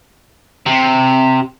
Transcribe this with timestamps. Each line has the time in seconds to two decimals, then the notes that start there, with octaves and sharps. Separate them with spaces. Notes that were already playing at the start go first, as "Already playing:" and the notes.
0.67 C3